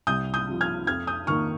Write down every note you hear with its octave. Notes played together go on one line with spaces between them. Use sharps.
C2 D#6 G6
D#6 G6
C3 F3
F6 G#6
F2 F6 G#6
D#6 G6
D#3 A#3 D#4 C#6 F6